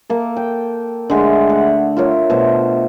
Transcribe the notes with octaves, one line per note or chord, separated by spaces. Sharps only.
A#3 A4
G5
D3 G#3 A3
A3 F#5
F4 A#4 C#5 E5
B2 A3 C5